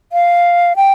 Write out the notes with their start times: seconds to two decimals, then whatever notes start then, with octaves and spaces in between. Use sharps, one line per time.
0.12 F5
0.76 G5